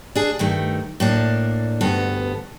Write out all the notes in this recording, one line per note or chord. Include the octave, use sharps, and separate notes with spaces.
D4 G#4
G2 D#3 A3
A2 A#3 D4
D2 G2 B3 A4